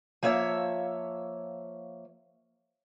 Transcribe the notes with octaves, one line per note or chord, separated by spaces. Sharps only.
F3 A#3 C#5 E5